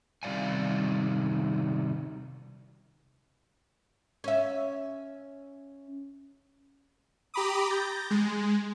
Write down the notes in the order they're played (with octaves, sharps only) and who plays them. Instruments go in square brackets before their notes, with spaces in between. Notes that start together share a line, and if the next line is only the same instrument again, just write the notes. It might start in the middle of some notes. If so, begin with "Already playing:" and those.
[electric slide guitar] C3 D#3 G3 D5 F5 G#5
[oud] C#4 E5
[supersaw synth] G4 A#5 B5 D6 D#6
G6 A6 A#6
G#3